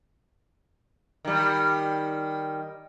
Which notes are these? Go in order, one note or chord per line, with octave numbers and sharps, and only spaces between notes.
D#3 G3